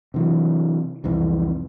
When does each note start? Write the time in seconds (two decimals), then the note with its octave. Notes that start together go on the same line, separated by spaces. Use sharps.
0.14 C3 E3 F#3
1.04 C2 F2 E3